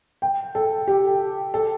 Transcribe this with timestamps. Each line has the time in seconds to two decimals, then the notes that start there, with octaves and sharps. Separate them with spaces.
0.22 G5
0.55 A4
0.88 G4
1.54 A4